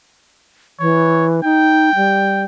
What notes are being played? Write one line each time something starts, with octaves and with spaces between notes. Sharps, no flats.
E3 C#5
D#4 G5
G3